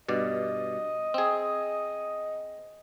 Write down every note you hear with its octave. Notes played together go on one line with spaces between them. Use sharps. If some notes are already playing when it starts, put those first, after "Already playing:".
G2 B2 D5 D#5
C4 G#4